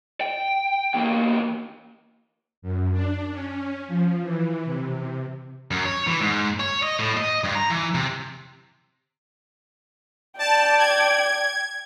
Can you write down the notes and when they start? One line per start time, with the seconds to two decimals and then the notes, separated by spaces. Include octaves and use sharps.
0.21 G5
0.94 E2 A#3
2.62 F#2
2.92 D4
3.31 C#4
3.88 F3
4.22 E3
4.65 C3
5.71 F#2
5.85 C#5
6.07 E3
6.21 G#2
6.60 C#5
6.82 D#5
6.99 A2
7.17 D#5
7.44 G2
7.55 A#5
7.70 E3
7.95 C3
10.39 D5 G5 A5
10.79 G#6